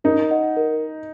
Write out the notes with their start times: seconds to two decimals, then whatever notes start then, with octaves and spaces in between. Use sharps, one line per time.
0.04 D#4 A#4
0.31 D#5 F#5
0.57 A#4